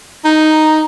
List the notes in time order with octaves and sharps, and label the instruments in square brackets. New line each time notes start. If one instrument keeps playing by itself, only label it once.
[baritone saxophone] D#4